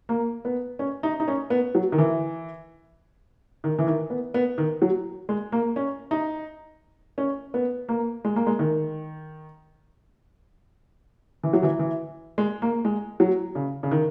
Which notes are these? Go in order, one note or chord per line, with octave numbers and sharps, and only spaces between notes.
A#3
B3
C#4
D#4
D#4
C#4
B3
F#3
D#3
E3
D#3
E3
D#3
B3
B3
D#3
F#3
G#3
A#3
C#4
D#4
C#4
B3
A#3
G#3
A#3
G#3
D#3
E3
F#3
E3
E3
G#3
A#3
G#3
F#3
C#3
C#3
D#3